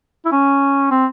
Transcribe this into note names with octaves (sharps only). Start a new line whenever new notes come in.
E4
C#4
C4